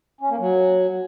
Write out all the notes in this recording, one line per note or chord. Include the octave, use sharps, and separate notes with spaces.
C#4
A#3
F#3